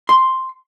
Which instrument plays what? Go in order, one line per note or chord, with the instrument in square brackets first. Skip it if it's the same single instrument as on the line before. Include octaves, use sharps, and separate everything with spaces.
[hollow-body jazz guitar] C6